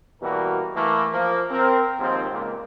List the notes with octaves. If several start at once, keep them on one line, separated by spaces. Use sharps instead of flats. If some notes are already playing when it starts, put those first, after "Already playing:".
B2 E3 G3 A#3 F#4 A#4
E3 A3 A#3
F3 A#3
C4 A#4
D#2 G#2 F3 C4
C#2 A#2